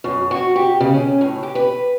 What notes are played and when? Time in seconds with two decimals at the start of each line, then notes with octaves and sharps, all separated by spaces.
0.04 F#2
0.31 F#4
0.56 G4
0.80 C#3
0.94 C#4
1.21 A2
1.43 G4
1.55 B4